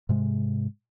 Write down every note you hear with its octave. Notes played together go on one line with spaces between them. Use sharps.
G#2 C3 G#3